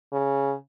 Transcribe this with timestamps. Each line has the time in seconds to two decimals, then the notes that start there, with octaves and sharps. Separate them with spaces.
0.12 C#3